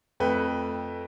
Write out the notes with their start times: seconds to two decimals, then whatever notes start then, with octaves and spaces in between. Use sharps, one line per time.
0.20 F2 A3 B4 G5